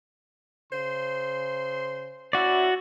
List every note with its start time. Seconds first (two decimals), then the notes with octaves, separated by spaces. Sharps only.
0.70 C#3 C5 C6
2.33 C#4 E4 F#4 D5